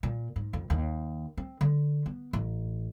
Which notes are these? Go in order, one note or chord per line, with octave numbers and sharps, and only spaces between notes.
A#2
G#2
F2
D#2
C4
D3
B3
A1